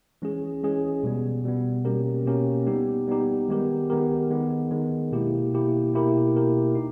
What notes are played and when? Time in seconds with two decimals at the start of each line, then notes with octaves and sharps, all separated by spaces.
0.22 E3 G#3 C#4 G#4
0.63 E3 G#3 C#4 G#4
1.03 B2 G3 B3
1.44 B2 G3 B3
1.85 B2 A#3 C#4 G4 A#4
2.25 B2 A#3 C#4 G4 A#4
2.67 G3 B3 D#4 G4
3.07 G3 B3 D#4 G4
3.48 D#3 G#3 B3 G4 A#4
3.90 D#3 G#3 B3 G4 A#4
4.31 D#3 G#3 B3
4.71 D#3 G#3 B3
5.12 B2 A#3 E4 G4
5.53 B2 A#3 E4 G4
5.94 B2 A#3 E4 G4 A#4
6.35 B2 A#3 E4 G4 A#4
6.75 D#4